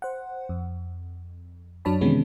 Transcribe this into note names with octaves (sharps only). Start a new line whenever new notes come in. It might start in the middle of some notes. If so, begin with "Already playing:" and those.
C5 F#5
F2
F#2 F#3 D4 C#5 A5 B5
C3 D#3 E3 G#3 B3 C#4